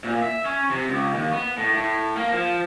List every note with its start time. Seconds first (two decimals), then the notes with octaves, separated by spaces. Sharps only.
0.04 A#2
0.23 E5
0.45 C#4
0.71 C3
0.88 C#2
1.14 D#2
1.33 B3
1.58 A2
1.74 A2
2.16 A#3
2.32 F3